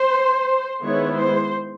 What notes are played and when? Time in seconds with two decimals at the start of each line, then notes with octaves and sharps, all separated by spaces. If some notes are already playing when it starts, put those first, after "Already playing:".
Already playing: C5
0.82 D#3 G#3 B3 E4 C#5
1.17 C5